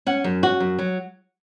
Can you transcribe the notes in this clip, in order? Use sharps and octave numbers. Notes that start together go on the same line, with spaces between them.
C#4 F#5
F#2
C#4 F#4
F#2
F#3